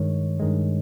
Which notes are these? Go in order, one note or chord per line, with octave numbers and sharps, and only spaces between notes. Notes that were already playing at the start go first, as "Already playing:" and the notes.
Already playing: G2 D#3 G#3 C#5
G2 D#3 G#3